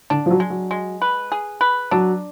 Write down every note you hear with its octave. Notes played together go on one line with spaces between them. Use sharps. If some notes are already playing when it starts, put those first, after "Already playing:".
D3 D4
F3
F#3
G#3
F#3
G#3
B4
G#4
B4
F#3 D4